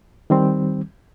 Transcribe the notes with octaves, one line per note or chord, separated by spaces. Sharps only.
D#3 G3 C4